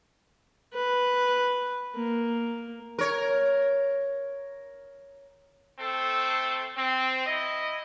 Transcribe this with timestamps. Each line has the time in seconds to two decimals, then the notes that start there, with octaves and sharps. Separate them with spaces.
0.74 B4
1.95 A#3
2.98 A#4 C#5
5.79 A3 C4 A4
6.76 C4
7.26 E4 D#5